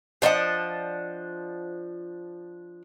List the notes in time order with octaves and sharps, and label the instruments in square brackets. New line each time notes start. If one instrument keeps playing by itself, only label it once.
[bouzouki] F3 D4 D#5 F#5